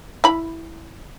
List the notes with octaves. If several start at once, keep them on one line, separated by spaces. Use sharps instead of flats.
E4 B5